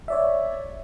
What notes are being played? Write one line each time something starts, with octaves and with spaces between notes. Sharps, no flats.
C#5 D5 E5